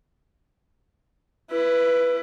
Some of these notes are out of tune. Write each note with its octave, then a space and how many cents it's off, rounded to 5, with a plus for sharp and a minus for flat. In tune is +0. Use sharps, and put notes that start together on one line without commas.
E4 +20 B4 +0